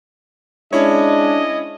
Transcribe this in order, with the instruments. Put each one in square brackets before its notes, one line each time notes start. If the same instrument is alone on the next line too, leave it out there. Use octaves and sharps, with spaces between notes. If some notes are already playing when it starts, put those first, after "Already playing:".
[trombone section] G#3 D4 [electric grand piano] C#4 E4 C#5 [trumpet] D#5